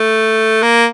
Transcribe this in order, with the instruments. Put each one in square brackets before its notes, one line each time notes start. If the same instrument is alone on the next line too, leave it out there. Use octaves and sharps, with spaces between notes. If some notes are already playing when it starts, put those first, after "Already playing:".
Already playing: [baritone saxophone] A3
A#3